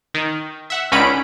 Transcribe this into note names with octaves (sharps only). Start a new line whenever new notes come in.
D#3
E5 F#5
C#2 D3 C#4 D#4 B5 D7